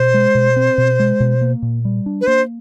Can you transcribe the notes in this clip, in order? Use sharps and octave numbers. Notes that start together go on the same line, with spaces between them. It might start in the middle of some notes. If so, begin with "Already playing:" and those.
Already playing: B2 C5
G#3
B2
C4
B2
G#3
B2
A#3
A#2
G3
D4
B4
A#3 C5